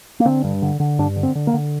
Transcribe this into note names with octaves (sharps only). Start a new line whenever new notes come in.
A#3
D3 C4
G2
D3
D3
G2 D4
D3
C4
D3
A#3
D3